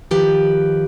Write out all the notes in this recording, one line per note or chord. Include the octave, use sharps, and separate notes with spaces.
D#3 F3 G4 B4